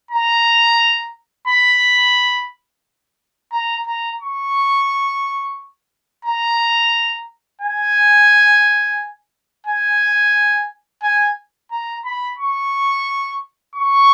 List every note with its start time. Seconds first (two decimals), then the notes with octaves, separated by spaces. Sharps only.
0.11 A#5
1.48 B5
3.52 A#5
3.87 A#5
4.21 C#6
6.25 A#5
7.62 G#5
9.67 G#5
11.03 G#5
11.71 A#5
12.05 B5
12.39 C#6
13.76 C#6